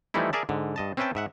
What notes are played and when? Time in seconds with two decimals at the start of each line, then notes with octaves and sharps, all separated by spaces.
0.14 E3 F3 G3 A3 D#4 E4
0.33 G#4 A#4 D5 E5 A5
0.49 G#2 D3
0.76 G2 D#5 A5
0.97 C4 C#4 B4 E5 G5 A5
1.15 G#2 E5 F#5